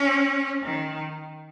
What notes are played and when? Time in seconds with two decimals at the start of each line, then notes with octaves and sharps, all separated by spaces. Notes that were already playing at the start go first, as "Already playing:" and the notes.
Already playing: C#4
0.64 D#3